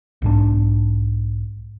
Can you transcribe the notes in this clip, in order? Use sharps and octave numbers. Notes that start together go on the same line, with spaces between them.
B1 G#2 D4